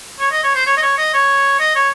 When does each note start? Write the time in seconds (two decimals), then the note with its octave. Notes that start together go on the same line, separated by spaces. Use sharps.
0.19 C#5
0.31 D#5
0.43 C#5
0.55 C5
0.66 C#5
0.77 D#5
0.82 C#5
0.98 D#5
1.14 C#5
1.60 D#5
1.75 C#5